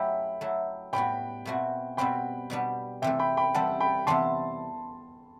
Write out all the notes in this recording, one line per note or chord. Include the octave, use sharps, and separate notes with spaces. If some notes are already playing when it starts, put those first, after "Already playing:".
Already playing: F#3 A3 E4 G4 G5 B5
F#3 A3 E4
A2 G3 B3 F#4 G5 B5
B2 A3 C4 F#4
B2 G3 C4 F#4 G5 B5
B2 G3 B3 D4
C3 E3 A3 E5 G5
G5 B5
G5 B5
E3 G3 C4 F#5 A5
G5 B5
C3 E3 B3 D4 A5 C6